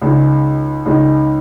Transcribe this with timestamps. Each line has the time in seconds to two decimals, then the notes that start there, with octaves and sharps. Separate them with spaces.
0.02 C#2 C#3 G#3 D#4
0.86 C#2 C#3 G#3 D#4